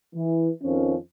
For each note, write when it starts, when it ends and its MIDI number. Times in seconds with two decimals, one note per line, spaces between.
0.15 0.50 52
0.63 0.95 41
0.63 0.95 51
0.63 0.95 53
0.63 0.95 61